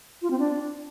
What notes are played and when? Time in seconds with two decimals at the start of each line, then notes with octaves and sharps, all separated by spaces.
0.22 F4
0.30 C4
0.39 D4